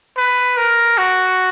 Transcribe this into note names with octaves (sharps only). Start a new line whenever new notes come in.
B4
A#4
F#4